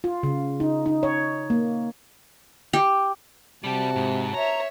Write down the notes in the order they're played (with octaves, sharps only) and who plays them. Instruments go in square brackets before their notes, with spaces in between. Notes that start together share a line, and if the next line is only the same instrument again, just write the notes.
[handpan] F4
C#3
D#4
D#4
C#5
A#3
[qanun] G4
[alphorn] C3 [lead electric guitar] G3 G4 [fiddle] F#4 A5
[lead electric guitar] G#2
[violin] C#5 E5 [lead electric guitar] A#5